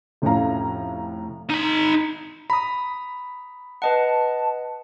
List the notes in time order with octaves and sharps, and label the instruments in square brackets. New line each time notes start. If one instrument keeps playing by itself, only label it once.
[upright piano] F1 A2 A3 C#4 F5 A#5
[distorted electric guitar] D#4 B5
[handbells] A#5 D#6 [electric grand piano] B5
[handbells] B4 D#5 F#5 [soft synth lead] A5